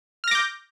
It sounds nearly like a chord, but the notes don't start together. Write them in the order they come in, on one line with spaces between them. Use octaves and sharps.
F6 A#6 D6 G6